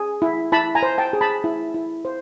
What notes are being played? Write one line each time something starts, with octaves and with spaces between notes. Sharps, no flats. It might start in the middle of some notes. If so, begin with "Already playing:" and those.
Already playing: G#4
E4
E4 A5 B5
G#5 A#5
C5
G5 A5
G#4
A5 B5
E4
E4
C5